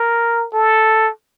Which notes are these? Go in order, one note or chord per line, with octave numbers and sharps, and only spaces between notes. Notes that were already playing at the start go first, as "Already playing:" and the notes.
Already playing: A#4
A4